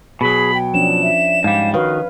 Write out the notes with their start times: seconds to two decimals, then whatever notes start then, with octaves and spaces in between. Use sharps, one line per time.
0.21 B2 F#3 G#4 B5
0.54 G5
0.74 F3 C#4 D4 E7
1.02 E5
1.44 G#2 G3 F5
1.74 D#3 F#4 B4 C#5 F5